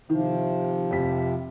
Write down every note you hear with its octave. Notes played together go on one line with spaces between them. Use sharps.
C3 D#3 F3
F1 G4 B6